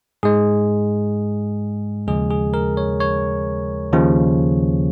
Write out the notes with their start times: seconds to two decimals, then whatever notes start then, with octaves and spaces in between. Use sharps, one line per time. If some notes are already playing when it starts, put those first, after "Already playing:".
0.23 G#2 G#3 G#4
2.07 D#2 C#3 F3 G#3 G#4
2.30 G#4
2.54 A#4
2.77 C#5
3.00 C#5
3.93 D#2 C#3 F3